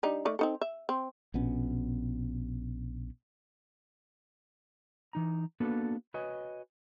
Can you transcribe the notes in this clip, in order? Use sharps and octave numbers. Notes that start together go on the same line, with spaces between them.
G3 D4 D#4
D#3 A3 D5
C4 D#4 A4
E5
C4
A#1 B2 B3 C#4
E3 D#4 A#5
A#3 B3 D4 F#4 A4 B4
F#4 B4 C#5 D#5 G#5